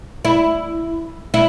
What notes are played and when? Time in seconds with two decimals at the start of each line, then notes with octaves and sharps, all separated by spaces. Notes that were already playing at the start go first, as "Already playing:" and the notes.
0.25 E4
1.34 E4